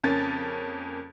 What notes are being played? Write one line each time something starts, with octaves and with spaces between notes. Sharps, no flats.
F2 C#3 A#3 C#4 A6